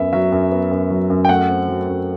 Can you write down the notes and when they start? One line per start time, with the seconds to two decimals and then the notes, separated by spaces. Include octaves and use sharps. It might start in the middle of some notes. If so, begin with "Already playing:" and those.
Already playing: F#2 B3 E5
0.13 F#3 E5
0.32 F#2
0.51 B3
0.71 F#2
0.90 F#3
1.10 F#2
1.25 G5
1.29 A3 F#5
1.49 C4
1.68 F#3
1.88 F#2